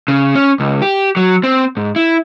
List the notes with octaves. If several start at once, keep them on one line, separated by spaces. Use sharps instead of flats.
C#3
C#4
C#2
G4
F#3
C4
G#2
E4